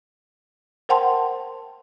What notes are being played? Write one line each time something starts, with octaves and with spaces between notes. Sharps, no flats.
A#4 C5 F#5 G5 A5 C6